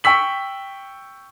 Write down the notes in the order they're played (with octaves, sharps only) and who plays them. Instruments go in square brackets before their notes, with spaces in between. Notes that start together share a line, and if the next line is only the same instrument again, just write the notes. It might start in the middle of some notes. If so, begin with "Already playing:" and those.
[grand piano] G5 C#6 E6 B6 F#7